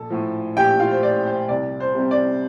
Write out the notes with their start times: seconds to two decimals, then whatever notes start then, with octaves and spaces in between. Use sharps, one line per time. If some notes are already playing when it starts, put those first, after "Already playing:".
Already playing: A#1 A4
0.10 A2 F3
0.56 A#1 G4 G5
0.80 F4 F5
0.91 C5
1.03 A2 F3 D5
1.26 C5
1.49 C2 D5
1.80 C5
1.95 C3 G3
2.11 D5